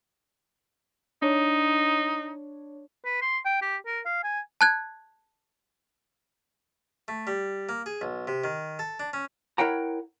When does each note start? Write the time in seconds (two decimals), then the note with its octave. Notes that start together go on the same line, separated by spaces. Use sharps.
1.22 D4 D#4 C#5
3.05 B4
3.22 C6
3.45 G5
3.62 G4
3.86 A#4
4.06 F5
4.24 G#5
4.61 A5 F#6 G#6
7.08 A3
7.27 G3
7.69 A#3
7.86 G#4
8.01 B1
8.27 C3
8.44 D#3
8.79 A4
9.00 D4
9.13 C#4
9.58 E4 A#4 C#5 F#5 G5 A#5